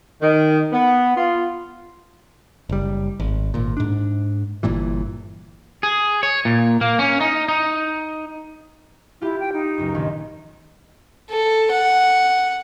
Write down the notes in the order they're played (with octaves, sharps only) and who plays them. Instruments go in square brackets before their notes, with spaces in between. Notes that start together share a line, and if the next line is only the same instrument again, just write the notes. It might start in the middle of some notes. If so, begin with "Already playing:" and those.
[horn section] D#3
B3
F4
[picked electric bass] F#1 G3
G#1
G#1 A#2
G#2 D4
G1 G2 A#2 E3
[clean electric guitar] G#4
C#5
A#2
A#3
C#4
D#4
D#4
[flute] E4 [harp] F4 G4
[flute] G5
D#4
[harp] C#2 F#2
A#1 D#3
[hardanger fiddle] A4
F#5